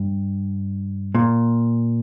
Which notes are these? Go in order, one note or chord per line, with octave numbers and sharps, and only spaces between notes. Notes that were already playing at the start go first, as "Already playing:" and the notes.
Already playing: G2
A#2